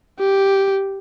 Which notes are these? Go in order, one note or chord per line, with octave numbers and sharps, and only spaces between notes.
G4